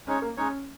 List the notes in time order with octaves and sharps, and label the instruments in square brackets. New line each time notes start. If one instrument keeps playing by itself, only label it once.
[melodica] G#3 D#4 C#5 [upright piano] C#4
[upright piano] A#3
[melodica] G#3 D#4 C#5 [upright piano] C#4